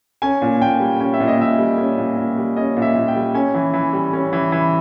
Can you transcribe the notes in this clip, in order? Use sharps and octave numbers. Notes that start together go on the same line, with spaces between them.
C#4 G#5
A#2
A#2 G5
G3
C#4 G5
E5
A#2
D#5
A#2 E5
G3
C#4
A#2
A#2
G3
C#4 D#5
A#2
E5
A#2
G5
G3
C#4 G#5
E3
E3
G3
C#4
E3
E3